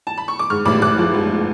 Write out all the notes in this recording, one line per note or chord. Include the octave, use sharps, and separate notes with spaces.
A5
B5
C#6
D6
G#2 C#6 F6
A1 B5 D6
A1 D6 F#6
F3
G#2